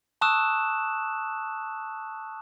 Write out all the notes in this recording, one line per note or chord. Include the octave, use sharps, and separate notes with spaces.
A5 C#6 D#6 E6 F#6 E7